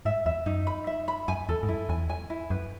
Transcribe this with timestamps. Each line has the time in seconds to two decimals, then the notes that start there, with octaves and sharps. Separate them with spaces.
0.05 G#2 E5
0.26 E2 E5
0.46 F#2 D#4
0.67 B5
0.87 E5
1.08 B5
1.28 F#2 G#5
1.49 E2 A4
1.63 G#2
1.69 F#2 E4
1.89 E2 G#5
2.10 G#5
2.30 E4
2.50 F#2 B4